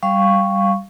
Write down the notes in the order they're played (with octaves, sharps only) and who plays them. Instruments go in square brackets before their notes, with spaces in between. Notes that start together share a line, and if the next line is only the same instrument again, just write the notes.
[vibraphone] G3 F5 C#6